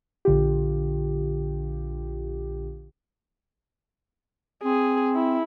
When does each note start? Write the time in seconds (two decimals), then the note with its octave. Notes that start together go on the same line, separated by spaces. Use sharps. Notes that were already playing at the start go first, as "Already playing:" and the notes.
0.25 A#1 D3 F4 G4
4.64 C4 G#4
5.15 E4